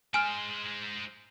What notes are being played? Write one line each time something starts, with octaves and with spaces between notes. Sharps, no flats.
G#3 C5 G#5 F6